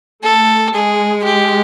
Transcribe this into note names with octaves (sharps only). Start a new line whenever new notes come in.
A3 A4
G#3 G#4
G4